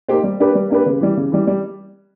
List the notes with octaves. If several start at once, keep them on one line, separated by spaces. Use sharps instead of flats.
A#3 D#4 G4 C5
G3
A#3 D4 G4 B4
G3
A#3 D4 G4 B4
C#3
E3 G3
C#3
E3 G3
G3